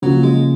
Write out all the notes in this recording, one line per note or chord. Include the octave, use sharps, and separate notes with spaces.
C#3 F3 F#3 A#3 F4
G#3